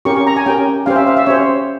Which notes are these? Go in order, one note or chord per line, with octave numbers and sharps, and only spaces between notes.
C#4 G4 A#4 C#6
C#6
A#5
G#5
C#4 G4 A#4 G5
C#4 G4 C5 F5
E5
F5
E5
C#4 G4 C5 C#5